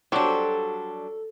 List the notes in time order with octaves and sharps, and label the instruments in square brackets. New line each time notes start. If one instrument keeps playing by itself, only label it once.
[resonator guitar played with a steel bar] F#3 G3 D4 [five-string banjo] F#4 G4 C5 [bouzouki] A4